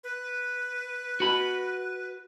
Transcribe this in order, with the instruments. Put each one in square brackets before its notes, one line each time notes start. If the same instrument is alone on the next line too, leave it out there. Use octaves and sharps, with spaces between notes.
[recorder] B4
[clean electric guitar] F#4 B5